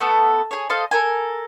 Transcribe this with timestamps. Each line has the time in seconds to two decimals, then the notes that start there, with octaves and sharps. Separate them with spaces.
0.01 A3 B3 A4
0.51 G#4 C#5
0.70 A4 C5 D#5 F5
0.91 A4 A#4 C5 G#5